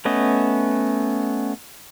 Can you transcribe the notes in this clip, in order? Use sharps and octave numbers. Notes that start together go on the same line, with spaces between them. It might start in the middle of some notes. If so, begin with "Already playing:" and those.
A3 B3 C#4 D#5